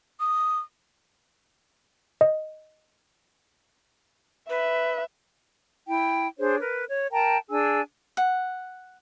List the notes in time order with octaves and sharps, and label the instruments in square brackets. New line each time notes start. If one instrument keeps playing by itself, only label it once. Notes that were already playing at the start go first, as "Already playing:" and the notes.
[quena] D#6
[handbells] D#5
[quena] B4 [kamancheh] E5
[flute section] E4 G5
D4 G#4 C5 C#5
A#4 B4
C#5
A#4 G5 A5 A#5
D4 G#4 G#5 E6
[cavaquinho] F#5